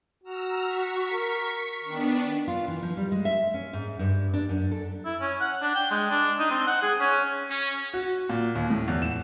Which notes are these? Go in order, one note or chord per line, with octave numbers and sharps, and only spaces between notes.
F#4 A#5 E6 F6
C#6 B6
A#4
D#3 B3 D4
F4
E3
F3
G3
G#3
E5
C#4
G#2
G2
D4
F#2
A4
E4
C#4
F#5
D4
G5
G#3
D4
D#4
C4
F#5
G#4
C#4
C#4
F#4
A#2
D#2
A2
E2
E7